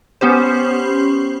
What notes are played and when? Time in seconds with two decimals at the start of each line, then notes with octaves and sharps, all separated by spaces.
0.21 B3 C#4 G4 C5